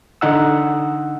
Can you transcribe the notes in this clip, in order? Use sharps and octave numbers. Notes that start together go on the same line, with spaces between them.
D3 D#4 F#5 E6